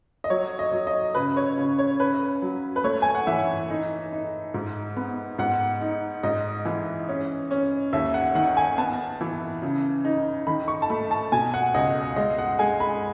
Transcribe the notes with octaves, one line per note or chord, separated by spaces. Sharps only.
D#5
F#3 C#5
D#5
F#3
D#5
C#3 B4
C#5
C#3
C#5
C#4 B4
F#3
B4
A3 C#5
G#5
F#5
E3 E5
D#4
D#4
G#2
B3
G#2 F#5
D#4
G#2 D#5
E3
C#4
C#4
D#2 E5
F#5
D#3 F#5
G#5
B3 A5
E3
C#3
D#4
D#3 B5
C#6
A5
A3 B5
A5
B2 G#5
F#5
C#2 D#5
G#3 D#5
F#5
G#3 G#5
B5